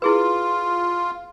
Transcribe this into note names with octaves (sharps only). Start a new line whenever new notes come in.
E4 F4 G#4 B4